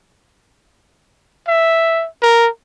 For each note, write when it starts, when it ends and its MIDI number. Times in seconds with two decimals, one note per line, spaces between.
1.48 2.06 76
2.22 2.48 70